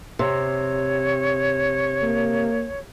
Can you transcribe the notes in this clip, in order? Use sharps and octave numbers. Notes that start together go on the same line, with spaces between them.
C3 C#5
A#3